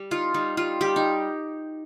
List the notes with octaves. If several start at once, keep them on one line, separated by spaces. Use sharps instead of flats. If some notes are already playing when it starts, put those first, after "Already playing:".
Already playing: G3
D#4 F4
G3 D#4
G3 F4
G3 G4
D#4